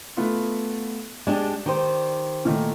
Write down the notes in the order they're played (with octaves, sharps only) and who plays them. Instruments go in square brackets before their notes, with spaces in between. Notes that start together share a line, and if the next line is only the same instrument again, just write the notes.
[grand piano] A3 B3 F4
[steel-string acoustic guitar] G#3 D4 G4 [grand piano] D5 E7
[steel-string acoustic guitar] D#3 G4 C5
[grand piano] A#2 D#3 A3